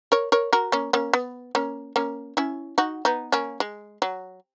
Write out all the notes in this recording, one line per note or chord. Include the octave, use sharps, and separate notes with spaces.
A#4 C#5
A#4 C#5
F#4 A#4
A#3 C#4
A#3 C#4
B3
A#3 C#4
A#3 C#4
C#4 E4
D#4 F#4
B3 D#4
A#3 C#4
G#3
F#3